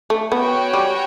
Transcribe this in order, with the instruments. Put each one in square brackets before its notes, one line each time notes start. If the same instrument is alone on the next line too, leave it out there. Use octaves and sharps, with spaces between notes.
[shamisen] A3
[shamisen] B3 [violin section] C#4 F#4 C#5 G5
[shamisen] G3